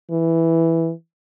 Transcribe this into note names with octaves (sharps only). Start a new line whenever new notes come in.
E3